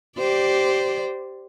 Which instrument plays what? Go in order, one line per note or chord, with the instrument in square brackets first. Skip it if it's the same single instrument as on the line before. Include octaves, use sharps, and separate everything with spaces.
[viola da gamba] G4 C5 D5